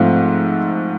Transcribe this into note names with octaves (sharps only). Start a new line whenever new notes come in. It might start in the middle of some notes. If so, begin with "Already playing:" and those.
Already playing: G#2 F3 A3 C4 F4